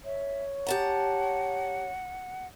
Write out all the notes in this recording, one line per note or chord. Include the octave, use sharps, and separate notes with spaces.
C#5 E5
G4 F#5 A5 A#5